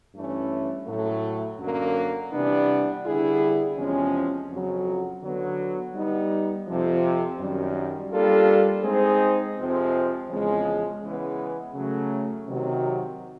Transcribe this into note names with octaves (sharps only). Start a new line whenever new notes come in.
G2 E3 A3 C#4
A2 F#3 A3
F#2 D3 F#3 A#3
C3 E3 G3 B3 D4
D3 G3 B3 E4 G#4
E2 C3 F3 G#3 C#4
F2 C#3 F#3
D3 F#3 B3
G3 B3 D#4
F2 C3 F3
F#2 D#3 G3
G3 A#3 D4 F4 A4
G#3 C4 D#4 G#4 C5
F2 C3 F3 G#3 C4
E2 C#3 F3 G#3
C#3 E3 G#3 B3
C#3 F#3 A3
C3 D#3 F#3